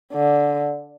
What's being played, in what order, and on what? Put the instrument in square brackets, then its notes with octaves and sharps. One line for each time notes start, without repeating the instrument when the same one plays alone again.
[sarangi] D3